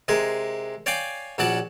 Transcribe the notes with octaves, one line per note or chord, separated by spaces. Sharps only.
C3 G#3 G#4 A#4
C#5 D5 F5 G5 G#5 D6
A#1 F#3 C#4 D5 F#5 A5